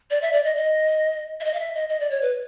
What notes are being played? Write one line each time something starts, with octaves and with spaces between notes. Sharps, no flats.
D5
E5
D5
D#5
D#5
E5
D#5
F5
E5
D#5
D#5
D5
C#5
B4